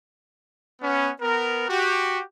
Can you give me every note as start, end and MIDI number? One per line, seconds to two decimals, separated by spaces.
0.82 1.10 59
0.82 1.10 61
1.22 1.66 59
1.22 1.66 70
1.69 2.21 66
1.69 2.21 67